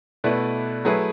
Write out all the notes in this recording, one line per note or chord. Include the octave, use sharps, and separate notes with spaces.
B2 A3 E4 B4 D5
F#3 A3 E4 G#4 B4